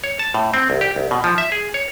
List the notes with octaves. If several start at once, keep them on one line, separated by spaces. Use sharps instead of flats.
C#5
A5
A2
C4
C2
G4
C2
B2
F3
E5
G#4
C#5